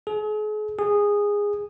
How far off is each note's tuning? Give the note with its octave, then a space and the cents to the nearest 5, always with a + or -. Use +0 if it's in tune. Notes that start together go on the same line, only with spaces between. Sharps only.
G#4 +40
G#4 -15